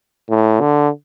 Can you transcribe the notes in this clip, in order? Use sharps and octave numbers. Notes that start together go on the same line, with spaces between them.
A2
D3